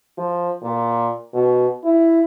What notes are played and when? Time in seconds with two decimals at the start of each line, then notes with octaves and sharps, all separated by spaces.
0.17 F3
0.62 A#2
1.34 B2
1.84 E4